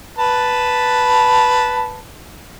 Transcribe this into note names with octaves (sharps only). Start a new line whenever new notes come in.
B4 A5